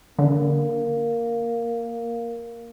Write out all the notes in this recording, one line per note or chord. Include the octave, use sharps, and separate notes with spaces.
D3 A#3